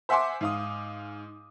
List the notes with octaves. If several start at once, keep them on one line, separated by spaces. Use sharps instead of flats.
C5 E5 F#5 G#5 C6 D6
G#2 F5 D#6